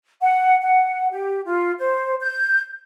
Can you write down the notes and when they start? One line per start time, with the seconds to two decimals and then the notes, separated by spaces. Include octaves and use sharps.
0.21 F#5
0.62 F#5
1.11 G4
1.45 F4
1.79 C5
2.22 G6